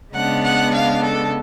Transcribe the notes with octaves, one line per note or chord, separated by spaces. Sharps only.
C#3 G#3 B3 D4 F#5
F#5
F5
A4